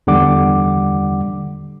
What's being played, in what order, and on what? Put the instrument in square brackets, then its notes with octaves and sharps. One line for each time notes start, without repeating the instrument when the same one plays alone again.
[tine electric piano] E2 D3 G3 F#5 D6